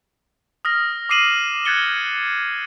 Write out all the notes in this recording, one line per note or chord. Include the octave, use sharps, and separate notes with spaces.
D#6 F6 A#6
D6 D#6 C7 D#7 E7 F#7
F#6 G#6 A6 C#7 G7